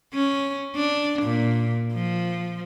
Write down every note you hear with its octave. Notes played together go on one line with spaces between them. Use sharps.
C#4
D4
A#2
F3